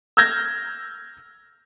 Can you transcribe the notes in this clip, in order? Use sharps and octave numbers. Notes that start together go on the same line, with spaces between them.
E6 F6 G6 G#6 A#6